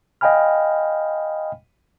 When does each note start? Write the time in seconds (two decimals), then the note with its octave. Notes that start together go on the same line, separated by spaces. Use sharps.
0.21 D#5 F5 G5 G#5 B5 F6